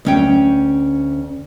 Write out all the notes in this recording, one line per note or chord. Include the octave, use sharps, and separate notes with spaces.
D2 C#4 G5